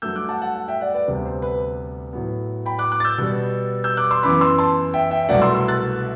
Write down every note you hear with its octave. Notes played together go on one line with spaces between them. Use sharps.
G2 F#3 A3 E6 G6
D6 F#6
F#5 A5
F#5 A5
F#5 A5
E5 G5
D5 F#5
B4 D5
D2 C3 G3 B3 C5
C5
B4
A2 F#3 B3
G5 B5
D6 F#6
D6 F#6
A6
E6 G6
B2 G3 B3
E6 G6
D6 F#6
C6 E6
F#2 E3 B3 B5 D6
C6 E6
A5 C6
E5 G5
E5 G5
E5
C2 B2 F#3 A3 D5 F#5
C6 E6
C6 E6
F#6 A6